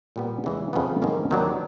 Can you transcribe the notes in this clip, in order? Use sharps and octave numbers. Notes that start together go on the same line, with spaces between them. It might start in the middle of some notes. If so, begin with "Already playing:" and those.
A#2 G3 B3
E2 C#3 E3 G#3
F2 C#3 F#3 B3
G#2 D#3 F#3 A#3 C#4
D#2 D#3 F#3 B3 D4